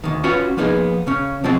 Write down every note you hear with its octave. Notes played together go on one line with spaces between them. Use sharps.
D2 D#3
C#4 F4 F#4 B4 C#5
F3 A#3 B3 D#4 G4 G#4
C#3 C#4
B2 F3 G#3 C4